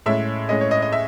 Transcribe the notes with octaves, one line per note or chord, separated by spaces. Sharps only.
A2 G#3 C#4 E5
A2 G#3 C#4 D#5
C#5
D#5
D#5
E5